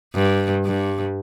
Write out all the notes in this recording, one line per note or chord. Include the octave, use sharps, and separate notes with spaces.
G2
G2